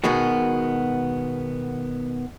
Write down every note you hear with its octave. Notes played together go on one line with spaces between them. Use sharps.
B2 D#3 G#3 B3 F#4